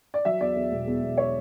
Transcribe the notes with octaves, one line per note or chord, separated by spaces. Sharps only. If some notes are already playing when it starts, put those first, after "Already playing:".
D5
F#3 E5
E2 D5
E2
E1
E2
E1
C#5